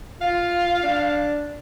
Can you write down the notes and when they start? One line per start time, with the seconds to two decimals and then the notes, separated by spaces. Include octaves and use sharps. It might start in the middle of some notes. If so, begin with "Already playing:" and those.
0.21 F4 F5
0.83 D4